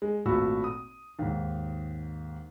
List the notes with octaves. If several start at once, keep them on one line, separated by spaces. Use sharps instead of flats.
G#3
G#1 A#2 A3 F#4 B5 E6
D#6
D#2 G#2